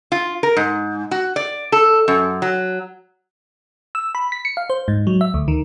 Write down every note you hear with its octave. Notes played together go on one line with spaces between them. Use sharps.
F4
A#4
G#2
F#4
D5
A4
F#2
F#3
E6
B5
B6
C#7
F5
C5
G#2
F#3
E5
D2
D#3